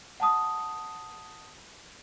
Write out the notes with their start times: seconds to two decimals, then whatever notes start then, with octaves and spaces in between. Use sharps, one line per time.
0.20 F#5 A5 D#6